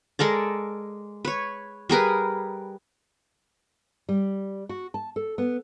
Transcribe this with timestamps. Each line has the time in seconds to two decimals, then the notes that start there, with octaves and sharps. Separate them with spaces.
0.19 G#3 A4 A#4 D5
1.25 B4 C#5
1.89 G3 G#4 A#4 B4
4.09 G3
4.69 F#4
4.94 A5
5.16 A4
5.38 B3